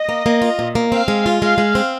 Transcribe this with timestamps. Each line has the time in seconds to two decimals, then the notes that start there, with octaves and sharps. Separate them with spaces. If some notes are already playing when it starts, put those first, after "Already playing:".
Already playing: D#5
0.09 A#3
0.26 A#3
0.42 F4
0.59 A#2
0.75 A#3
0.92 C4 F5
1.08 G#3
1.26 F4
1.42 G#3 F5
1.58 G#3
1.75 C4